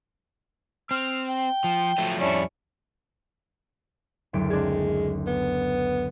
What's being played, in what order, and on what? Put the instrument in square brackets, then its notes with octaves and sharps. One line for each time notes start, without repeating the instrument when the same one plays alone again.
[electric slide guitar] C4 [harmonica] F6
[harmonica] G5
[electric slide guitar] F3
F3 F#3 A3
[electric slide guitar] F2 G3 [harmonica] C#4 D4 E4
[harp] F#1 D2 D7
[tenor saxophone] G#3 [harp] C4 D4 G#6
[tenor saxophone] B3